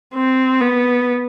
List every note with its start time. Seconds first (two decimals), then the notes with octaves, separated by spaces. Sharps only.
0.15 C4
0.61 B3